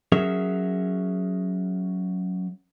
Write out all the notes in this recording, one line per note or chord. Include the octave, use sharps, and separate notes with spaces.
F#3 C#4 G#4 A#4 E5